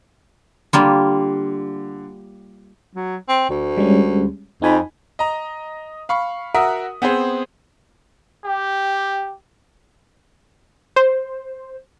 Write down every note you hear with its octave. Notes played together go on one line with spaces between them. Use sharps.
D3 G3 A#3 F4
F#3
C4
D2
G3 G#3 C#4
F2 D#4 G#5 B5
D#5 A#5
F5 B5 C#6
F#4 A#4 E5 F#5 D#6
B3 C4 G#4 C5
G4
C5